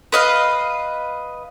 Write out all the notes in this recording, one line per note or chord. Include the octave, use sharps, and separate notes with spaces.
B4 D#5 F5